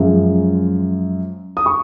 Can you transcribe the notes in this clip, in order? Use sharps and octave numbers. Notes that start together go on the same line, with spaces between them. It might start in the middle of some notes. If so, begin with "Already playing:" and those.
Already playing: F#2 F3 G#3
D#6
C#6